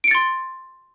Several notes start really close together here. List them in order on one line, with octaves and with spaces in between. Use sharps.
D7 C#7 A6 C6